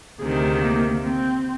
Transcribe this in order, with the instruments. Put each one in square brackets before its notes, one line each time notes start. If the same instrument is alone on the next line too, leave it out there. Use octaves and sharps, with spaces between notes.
[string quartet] D2 C3 D#3 [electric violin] G#4
[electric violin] A#3
C4